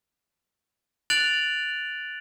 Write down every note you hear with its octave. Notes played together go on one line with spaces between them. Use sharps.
F#6 A6 D7 F7 F#7